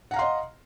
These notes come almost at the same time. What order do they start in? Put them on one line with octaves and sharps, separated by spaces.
F#5 A#5 F5 C6 D#5